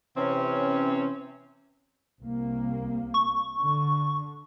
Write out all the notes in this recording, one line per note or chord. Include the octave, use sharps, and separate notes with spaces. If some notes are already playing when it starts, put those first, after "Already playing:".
C3 E3 C4 C#4
C2 A#3
C#6
D3